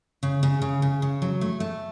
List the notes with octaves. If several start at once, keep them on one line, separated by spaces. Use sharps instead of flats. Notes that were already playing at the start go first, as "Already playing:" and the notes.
C#3
C#3
C#3
C#3
C#3
F#3
A3
A3